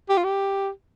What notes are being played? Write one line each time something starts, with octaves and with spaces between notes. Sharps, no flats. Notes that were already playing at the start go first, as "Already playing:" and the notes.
G4
F4
G4